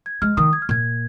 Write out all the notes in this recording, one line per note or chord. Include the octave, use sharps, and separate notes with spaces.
G#6
G#3 F6
D#3 D#6
G#6
F6
A#2 G#6